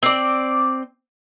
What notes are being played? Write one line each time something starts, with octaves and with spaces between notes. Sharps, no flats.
C4 D5